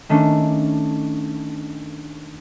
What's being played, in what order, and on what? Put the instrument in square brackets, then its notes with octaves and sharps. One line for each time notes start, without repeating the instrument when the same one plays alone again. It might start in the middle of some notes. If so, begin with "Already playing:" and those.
[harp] D#3 A3 C#4 D4